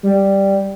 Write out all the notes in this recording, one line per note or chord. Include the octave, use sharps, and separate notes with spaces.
G3